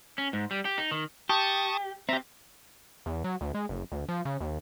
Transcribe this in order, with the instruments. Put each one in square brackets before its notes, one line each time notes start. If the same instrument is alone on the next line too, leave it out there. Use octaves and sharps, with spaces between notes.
[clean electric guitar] C#4
G#2
G3
G4
D#4
D#3
[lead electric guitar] G4 [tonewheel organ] A5 C#6 D#6
[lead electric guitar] C4 G4 [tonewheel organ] E5 A#5
[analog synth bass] E2
F#3
D2
G#3
F#1
D2
F3
C#3
D#2